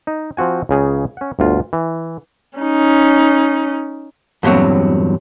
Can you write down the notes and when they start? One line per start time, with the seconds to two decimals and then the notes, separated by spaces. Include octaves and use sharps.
0.07 D#4
0.37 F3 C4 F#4 G#5
0.69 C#2 C#3 G#4
1.17 C#4 F#5
1.39 G1 D2 F4
1.73 E3
2.58 C#4 D#4
4.43 E2 G2 A#2 F#3 C4